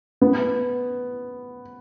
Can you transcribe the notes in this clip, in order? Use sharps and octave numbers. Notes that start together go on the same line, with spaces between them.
B3